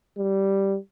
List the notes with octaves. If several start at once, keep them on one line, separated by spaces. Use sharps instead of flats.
G3